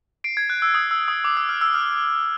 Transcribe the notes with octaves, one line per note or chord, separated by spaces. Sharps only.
C7 D7
G#6
F#6
E6
D#6
E6
D#6
D6
E6
F6
E6
F6